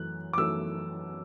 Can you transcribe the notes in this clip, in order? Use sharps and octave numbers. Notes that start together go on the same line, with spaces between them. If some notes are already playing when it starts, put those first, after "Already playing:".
Already playing: F#2 E3 A3 F#6
D6
F#2 E3 A3 E6